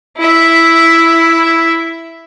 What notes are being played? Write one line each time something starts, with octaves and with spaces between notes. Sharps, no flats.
E4 E5